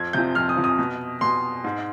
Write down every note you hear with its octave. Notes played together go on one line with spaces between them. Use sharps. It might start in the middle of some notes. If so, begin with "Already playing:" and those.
Already playing: F2 G#6
C3 F3 G6
F2 F6
D#6
C3 F3
D#6
B2
B2 C6
G#2